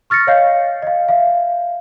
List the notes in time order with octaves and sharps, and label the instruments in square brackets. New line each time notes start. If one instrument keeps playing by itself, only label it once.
[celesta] C#6 F6 A6 A#6 C#7
C#5 D#5 F5 G6 C7
D#5 F5
E5 F5